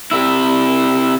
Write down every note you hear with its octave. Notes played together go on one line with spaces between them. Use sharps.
C3 E4